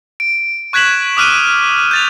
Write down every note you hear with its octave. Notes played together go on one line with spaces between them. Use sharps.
D7
C#6 F#6 G#6 B6 E7 F#7
D6 D#6 F6 F#6 B6 D#7
G6 A6 F7